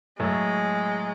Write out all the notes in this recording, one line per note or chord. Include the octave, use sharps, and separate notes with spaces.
A2 F#3 G#3 A3